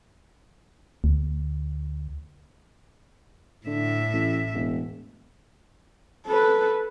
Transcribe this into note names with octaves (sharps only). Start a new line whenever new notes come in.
D2
A2 D3 E5
A1
E1
A4 B4